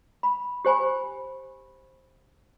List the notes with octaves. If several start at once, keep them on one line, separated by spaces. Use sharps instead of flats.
B5
G4 C5 G#5 B5